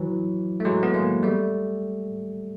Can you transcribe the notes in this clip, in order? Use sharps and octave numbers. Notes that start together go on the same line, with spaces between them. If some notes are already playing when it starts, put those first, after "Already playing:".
Already playing: E3 F#3
A3
F#3 G#3
B3
G#3 A#3
G3 A3